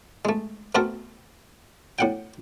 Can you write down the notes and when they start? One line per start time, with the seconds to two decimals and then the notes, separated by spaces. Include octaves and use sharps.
0.25 G#3 A3
0.75 A3 B3 C4 F#4 A4 A#4
1.99 A2 F#5 G5